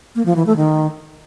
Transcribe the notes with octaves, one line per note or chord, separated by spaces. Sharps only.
A#3
F3
E3
A3
D#3